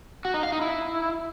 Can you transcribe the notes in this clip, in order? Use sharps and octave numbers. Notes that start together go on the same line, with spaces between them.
F#4
D#4
F5
D#4
E4